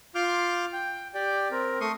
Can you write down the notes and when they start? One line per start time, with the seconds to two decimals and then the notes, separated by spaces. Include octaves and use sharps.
0.15 F4 C6 D6 F6 G6
0.73 G5
1.14 G4 D5 G5
1.51 C4 A#4
1.81 A3 C6 C#6 D#6